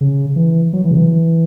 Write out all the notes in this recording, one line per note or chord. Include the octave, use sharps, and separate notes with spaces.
C#3
E3
F#3
E3
C#3
E3